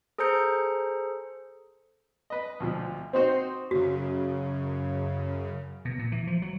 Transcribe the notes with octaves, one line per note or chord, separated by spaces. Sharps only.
G#4 A4 C5 A#5 G6 C#7
B4 D#5
D2 B2 F3
C4 D#4 F#4 C5
F#2 C#3 F#4
B2
A#2
E3
F3
F#3